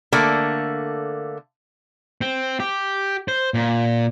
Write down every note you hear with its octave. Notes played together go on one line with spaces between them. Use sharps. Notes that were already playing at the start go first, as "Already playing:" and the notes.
D3 A3 A#3
C4
G4
C5
A#2